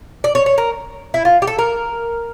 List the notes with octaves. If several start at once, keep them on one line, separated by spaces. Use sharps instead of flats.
D5
C#5
C#5
A#4
E4
F4
G4
A4
A#4